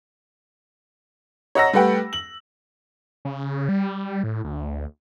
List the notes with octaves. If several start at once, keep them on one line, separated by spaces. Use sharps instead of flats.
C#5 D#5 F#5 A#5 E6 A#6
G3 A3 B4 F#5 G5
F#7
C#3
G3
A2
D2